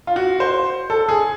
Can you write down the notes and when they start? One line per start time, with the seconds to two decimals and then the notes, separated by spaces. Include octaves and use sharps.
0.07 F4
0.16 F#4
0.40 C5
0.90 A4
1.09 G#4